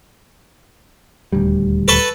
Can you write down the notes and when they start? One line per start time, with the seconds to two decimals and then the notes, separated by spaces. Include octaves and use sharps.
1.32 D#1 D2 G3
1.88 A4 B4 C#6